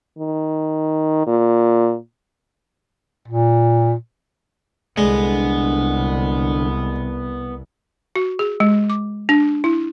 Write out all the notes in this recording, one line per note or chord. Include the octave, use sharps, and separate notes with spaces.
D#3
A#2
A#2
C2 D3 G#3 B3
F#4
G#4
G#3
D6
D4
E4